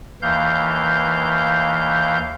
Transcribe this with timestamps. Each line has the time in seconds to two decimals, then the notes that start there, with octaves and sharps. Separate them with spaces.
0.22 D#2 E3 F5 G6